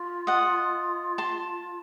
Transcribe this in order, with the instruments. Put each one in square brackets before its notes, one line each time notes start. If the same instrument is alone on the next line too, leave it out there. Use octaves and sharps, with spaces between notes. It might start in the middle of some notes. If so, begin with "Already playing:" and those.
Already playing: [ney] F4
[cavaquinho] D#5 F#5
A5 C6